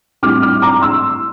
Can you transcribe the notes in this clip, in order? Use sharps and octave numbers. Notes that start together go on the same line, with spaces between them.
A2 G3 C4 D6 F6
D6 F6
A#5 D6
C6 E6